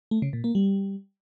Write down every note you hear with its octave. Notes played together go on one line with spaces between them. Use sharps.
A3
C#3
A#2
A#3
G3